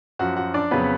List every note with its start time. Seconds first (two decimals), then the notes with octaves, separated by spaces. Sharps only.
0.19 F#2 F3 F#4 F#5
0.36 F#4 F#5
0.54 D4 D5
0.71 F2 C#3 F#3 B3 B4